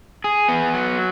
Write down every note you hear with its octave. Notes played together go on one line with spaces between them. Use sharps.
G#4
B3
F#3